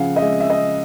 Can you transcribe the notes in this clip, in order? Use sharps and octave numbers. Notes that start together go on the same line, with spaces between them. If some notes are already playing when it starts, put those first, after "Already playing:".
Already playing: C#3 F3 F5 F#5
D#5
G#3 E5
E5
D#5